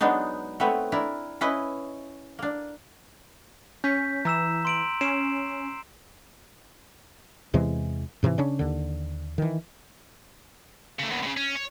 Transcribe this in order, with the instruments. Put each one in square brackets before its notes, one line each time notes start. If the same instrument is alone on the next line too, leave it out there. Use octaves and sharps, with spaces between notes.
[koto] F#3 G#3 B3 D4 D#4
A3 B3 C4 B4 C#5
D4 E4 A#4
C#4 E4 B4 D#5
A#3 D4
[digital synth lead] C#4 [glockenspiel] G6 B6
[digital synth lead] E3 [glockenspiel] A#5 E6 E7
[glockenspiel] C6 D7 F#7
[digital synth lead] C#4 [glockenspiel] C7 D7 E7
[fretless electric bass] E2 C3 E3 G#3
G#2 C3 D#3 E3
C#3 C#4 D4
D#2 D3
D#3 E3
[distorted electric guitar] C#3 A3
D#2 B2
A2 C#3
C#4
C#5